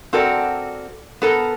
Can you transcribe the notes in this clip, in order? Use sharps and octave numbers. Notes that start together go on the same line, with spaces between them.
C4 F#4 A4 A#4 D5
B3 A4 A#4